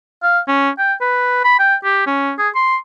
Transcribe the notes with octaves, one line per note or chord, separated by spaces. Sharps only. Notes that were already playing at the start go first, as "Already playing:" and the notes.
F5
C#4
G5
B4
B5
G5
G4
C#4
G#4
C6